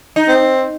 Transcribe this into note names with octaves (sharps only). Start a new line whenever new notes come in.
D#4
C4